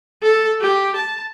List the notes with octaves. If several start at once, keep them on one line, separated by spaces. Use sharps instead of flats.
A4
G4
A5